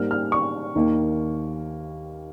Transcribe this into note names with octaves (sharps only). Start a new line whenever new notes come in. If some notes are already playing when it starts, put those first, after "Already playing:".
Already playing: G#2 G3 A#3 F6
F6
C#6
D#2 D#3 A#3